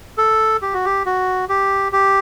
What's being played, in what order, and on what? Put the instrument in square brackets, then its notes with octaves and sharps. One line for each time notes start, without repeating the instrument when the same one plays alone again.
[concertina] A4
G4
F#4
G4
F#4
G4
G4